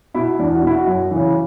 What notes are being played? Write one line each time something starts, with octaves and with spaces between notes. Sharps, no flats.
B2 E4
E2 D4
F#4
B2 E4
F#4
F#2
E3
C#3